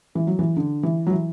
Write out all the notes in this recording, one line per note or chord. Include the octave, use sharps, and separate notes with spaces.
E3
F#3
E3
D3
E3
F#3
E3